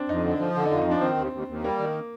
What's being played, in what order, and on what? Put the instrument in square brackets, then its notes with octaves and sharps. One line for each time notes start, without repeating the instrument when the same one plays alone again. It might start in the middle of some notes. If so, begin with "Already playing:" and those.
Already playing: [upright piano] C4 D4
[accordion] F2 [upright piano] D#4
[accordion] D3
F3
D3
[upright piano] D#4
[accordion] F2 [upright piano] F4
[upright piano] D#4
[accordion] F3
[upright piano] D4
[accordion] D#3 [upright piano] C4
[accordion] D#2
D#2
D#2
[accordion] G3 [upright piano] A#3
[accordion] D#3